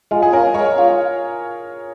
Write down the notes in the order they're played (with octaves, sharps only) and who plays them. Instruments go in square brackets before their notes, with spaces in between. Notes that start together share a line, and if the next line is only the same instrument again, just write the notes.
[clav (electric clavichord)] G#3 [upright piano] F4
[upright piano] G#4
[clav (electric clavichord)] C#4 F4 [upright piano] A#4
[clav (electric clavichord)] G#3 [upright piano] C#5
[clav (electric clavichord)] C#4 F4